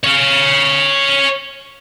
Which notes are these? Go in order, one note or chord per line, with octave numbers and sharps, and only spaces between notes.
C#5 F5